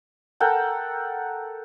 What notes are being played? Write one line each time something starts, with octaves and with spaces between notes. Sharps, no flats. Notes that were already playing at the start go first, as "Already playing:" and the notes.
A4 A#4 F#5 G5